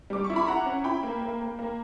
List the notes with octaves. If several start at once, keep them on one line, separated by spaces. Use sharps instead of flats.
G3 D6
C#6
E4
B5
E4 F#5 A#5
C#4
E4 G5 B5
A#3
A#3
A#3
A#3